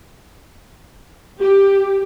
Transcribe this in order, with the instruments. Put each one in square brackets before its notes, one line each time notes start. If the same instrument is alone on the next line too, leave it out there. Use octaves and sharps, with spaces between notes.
[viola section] G4